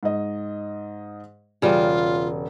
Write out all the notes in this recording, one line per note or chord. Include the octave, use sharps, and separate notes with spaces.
G#2 D#5
E1 C#3 G3 F4